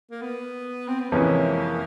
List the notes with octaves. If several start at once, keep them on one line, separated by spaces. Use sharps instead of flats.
A#3
B3
C4
B3
F2 C3 E3 G#3 A#3 C#4